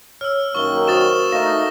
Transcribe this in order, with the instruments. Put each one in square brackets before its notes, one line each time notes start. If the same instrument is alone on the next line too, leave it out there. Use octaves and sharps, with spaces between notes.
[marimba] C#5 [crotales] E6 F6
[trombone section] F#2 D#3 A#3 [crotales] C#6 G7
[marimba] F#4 A#4 C5 [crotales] D#6 A6 E7
[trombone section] A3 D#4 [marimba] F5 [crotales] C#6 A#6